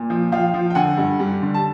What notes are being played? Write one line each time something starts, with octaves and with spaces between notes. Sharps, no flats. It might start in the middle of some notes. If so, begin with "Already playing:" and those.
Already playing: A#2
F3
F3 F5 G5
F3
G5
D3 F#5 G#5
G2
G3
D3
A5